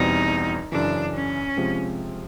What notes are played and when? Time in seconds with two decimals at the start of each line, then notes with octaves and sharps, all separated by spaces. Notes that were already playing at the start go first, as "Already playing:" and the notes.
Already playing: E2 B2 G3 C4 D#4
0.72 F#2 C#3 E3 D4
1.14 C#4
1.57 C3 F3 G#3 C4